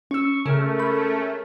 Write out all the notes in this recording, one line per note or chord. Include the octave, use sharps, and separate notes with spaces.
C#4 C#6 E6
C#3 G#3 A3 C#4 A#4
B5